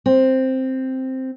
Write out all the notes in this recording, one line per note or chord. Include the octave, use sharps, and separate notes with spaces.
C4